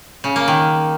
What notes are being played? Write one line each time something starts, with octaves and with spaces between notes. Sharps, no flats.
C#3
A#3
D#3